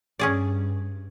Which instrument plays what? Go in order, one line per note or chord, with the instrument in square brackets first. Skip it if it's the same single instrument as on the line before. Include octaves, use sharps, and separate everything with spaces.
[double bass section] G2 [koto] C#4 G#4 D5